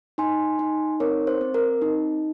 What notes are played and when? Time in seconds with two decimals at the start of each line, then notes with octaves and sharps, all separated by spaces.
0.18 D#4 G#5 C6
0.59 D#4
1.00 C4 A#4 C#5
1.27 C5
1.41 C4
1.54 A#4
1.82 D#4